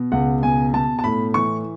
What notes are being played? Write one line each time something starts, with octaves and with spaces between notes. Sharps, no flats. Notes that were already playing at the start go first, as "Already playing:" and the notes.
Already playing: B2
C#2 F#5
B2 G#5
B2 A5
A5
A2 B5
E3 C#6